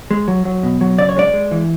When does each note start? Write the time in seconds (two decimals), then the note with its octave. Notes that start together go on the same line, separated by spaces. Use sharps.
0.11 G#3
0.28 F#3
0.45 F#3
0.63 B2
0.81 F#3
0.99 C#3 D5
1.09 C#5
1.17 G#3 D5
1.33 G#3
1.51 E3